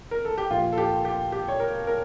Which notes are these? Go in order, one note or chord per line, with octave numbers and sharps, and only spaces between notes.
A#4
A4
G4
A#2 F3 A#3 F4
A4
G4
G4
G4
C#5
A#4
A#4